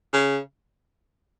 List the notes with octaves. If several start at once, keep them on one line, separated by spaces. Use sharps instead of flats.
C#3